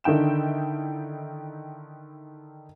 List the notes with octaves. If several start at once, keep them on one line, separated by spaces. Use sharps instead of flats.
D3 D#3 E4 G5 E7